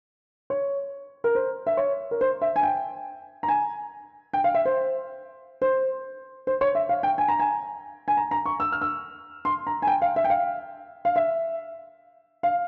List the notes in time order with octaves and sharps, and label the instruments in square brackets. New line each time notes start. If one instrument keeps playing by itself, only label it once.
[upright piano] C#5
A#4
C5
E5
C#5
A#4
C5
E5
G#5
G5
A#5
G#5
G5
F5
E5
C5
C5
C5
C#5
E5
F5
G5
G#5
A#5
G#5
G#5
A#5
A#5
C#6
E6
F6
E6
C6
A#5
G#5
G5
F5
E5
G5
F5
F5
E5
F5